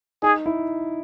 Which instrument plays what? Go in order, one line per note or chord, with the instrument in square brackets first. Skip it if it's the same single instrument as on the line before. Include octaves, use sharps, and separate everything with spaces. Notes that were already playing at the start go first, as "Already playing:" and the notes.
[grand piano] D#4 [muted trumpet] G#4
[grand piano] E4